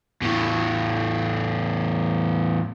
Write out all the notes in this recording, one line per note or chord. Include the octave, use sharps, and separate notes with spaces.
E2 A2